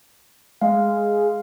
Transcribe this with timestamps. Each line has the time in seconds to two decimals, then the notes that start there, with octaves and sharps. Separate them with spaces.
0.61 G#3 F5